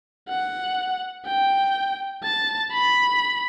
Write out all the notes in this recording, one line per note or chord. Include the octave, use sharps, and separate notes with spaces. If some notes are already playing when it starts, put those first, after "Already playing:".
F#5
G5
A5
B5